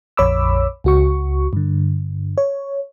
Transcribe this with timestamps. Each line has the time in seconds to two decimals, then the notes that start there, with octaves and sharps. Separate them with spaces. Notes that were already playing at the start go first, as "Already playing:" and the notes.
0.17 A#1 F2 C#5 B5 D6 E6
0.84 C#2 F#4 C#6
1.53 G2 D3
2.38 C#5